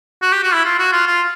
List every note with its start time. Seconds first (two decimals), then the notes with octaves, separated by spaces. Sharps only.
0.22 F#4
0.32 G4
0.43 F#4
0.53 E4
0.65 F4
0.79 F#4
0.92 F4
1.06 F4